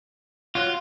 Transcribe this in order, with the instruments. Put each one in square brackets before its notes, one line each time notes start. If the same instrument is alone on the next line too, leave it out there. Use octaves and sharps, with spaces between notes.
[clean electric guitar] F4 [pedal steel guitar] F#4 C#5 F#6